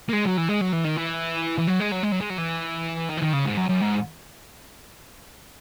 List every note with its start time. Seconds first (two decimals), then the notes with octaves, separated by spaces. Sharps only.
0.09 A#3
0.13 G#3
0.25 F#3
0.38 E3
0.49 G#3
0.61 F#3
0.73 E3
0.84 D#3
0.96 E3
1.58 E3
1.67 F#3
1.80 G#3
1.91 F#3
2.03 G#3
2.12 F#3
2.21 G#3
2.30 F#3
2.38 E3
3.09 D#3
3.17 E3
3.21 D#3
3.33 C#3
3.45 G#2
3.57 F#2
3.69 F#2
3.81 G#2